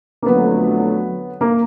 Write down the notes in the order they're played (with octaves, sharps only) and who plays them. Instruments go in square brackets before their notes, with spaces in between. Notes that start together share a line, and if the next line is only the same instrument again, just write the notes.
[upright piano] A#3
[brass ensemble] F2 D3 F#3 A3 [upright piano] B3
[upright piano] A#3